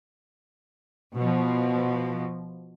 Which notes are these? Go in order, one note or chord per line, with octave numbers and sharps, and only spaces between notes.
B2 F3